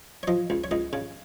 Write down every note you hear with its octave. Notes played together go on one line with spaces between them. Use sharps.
C#5
F3 D#5
C#2
C#5
C#2 D#5
C#3